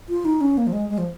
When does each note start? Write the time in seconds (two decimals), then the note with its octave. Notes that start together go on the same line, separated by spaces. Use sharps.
0.09 F4
0.25 D#4
0.41 C#4
0.57 A#3
0.67 F3
0.73 G#3
0.89 G#3
0.98 F3